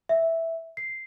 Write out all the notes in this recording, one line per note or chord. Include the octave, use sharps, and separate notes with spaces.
E5
C7